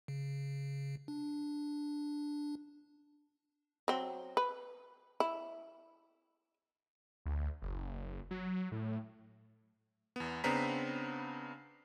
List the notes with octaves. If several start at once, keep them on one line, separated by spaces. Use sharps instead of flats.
C#3
D4
F#3 C4
B4
E4
D2
F#1
F#3
A2
E2 B3
C#3 B3 C4 D4 A#5 B6